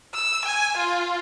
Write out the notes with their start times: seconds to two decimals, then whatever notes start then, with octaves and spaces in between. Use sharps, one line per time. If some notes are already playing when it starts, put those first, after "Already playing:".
0.14 E6
0.45 G#5
0.77 F4